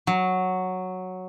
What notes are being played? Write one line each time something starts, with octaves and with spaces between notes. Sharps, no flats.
F#3